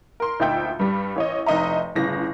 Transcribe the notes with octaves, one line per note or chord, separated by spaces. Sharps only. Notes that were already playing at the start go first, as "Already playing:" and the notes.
A#4 C6
D2 A#2 D#4 E5 G5 G6
G2 G3
A1 C#5 D#5
F1 D#4 D#5 E5 A#5
G1 A2 C#3 A#6